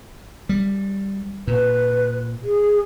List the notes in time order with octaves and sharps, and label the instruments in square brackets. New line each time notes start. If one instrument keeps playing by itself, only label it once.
[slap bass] G3
[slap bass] A#2 [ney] B4
[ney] G#4